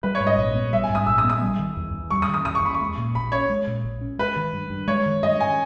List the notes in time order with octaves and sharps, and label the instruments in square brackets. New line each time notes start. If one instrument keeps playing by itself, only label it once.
[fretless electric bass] G3 [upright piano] B4
[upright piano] C#5
[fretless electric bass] G#2
[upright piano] D#5
[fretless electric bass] A#1
B3
[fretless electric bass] G3 [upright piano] E5
[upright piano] G#5
[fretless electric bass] G#2
[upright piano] D#6
[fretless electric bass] A#1 [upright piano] E6
[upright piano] D#6
[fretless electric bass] B3
[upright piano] D#6
[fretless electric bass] G3
D#3
E2
E2
[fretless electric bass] G3 [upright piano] C#6
[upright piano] D#6
[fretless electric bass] D#3
[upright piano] D#6
[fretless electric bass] E2 [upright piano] D#6
[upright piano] C#6
[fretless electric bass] E2 [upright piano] B5
[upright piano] C#6
[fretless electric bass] G#3
A#2
[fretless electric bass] A#1 [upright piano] B5
[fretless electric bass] C#4 [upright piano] C#5
[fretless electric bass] G#3
A#2
A#1
C#4
[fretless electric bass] G#3 [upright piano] B4
[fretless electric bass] D#3
G2
G2
[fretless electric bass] G#3 [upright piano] C#5
[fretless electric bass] D#3
[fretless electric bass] G2 [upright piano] D#5
[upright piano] G#5